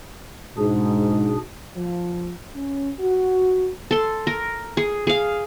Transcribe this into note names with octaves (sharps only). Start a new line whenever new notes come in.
G#2 B2 D4 G#4
F3
C#4
F#4
A4 C6
A#4
G#4
G#4 F5